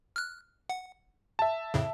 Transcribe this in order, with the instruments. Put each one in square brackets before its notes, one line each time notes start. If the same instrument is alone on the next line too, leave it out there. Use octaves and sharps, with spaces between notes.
[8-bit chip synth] F6 F#6
F#5
[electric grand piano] E5 A5
[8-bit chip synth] F2 A2 C#3